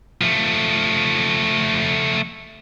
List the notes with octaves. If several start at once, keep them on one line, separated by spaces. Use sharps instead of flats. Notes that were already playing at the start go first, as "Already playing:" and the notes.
F3 A3